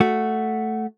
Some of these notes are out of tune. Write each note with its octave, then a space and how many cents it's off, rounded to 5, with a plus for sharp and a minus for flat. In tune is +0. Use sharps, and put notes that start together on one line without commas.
A3 +0 F#4 +0